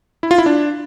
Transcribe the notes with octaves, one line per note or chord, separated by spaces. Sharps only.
E4
F4
E4
D4